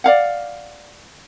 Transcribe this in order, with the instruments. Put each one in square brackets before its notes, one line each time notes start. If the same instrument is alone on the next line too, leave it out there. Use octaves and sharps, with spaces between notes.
[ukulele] D5 F5 F#5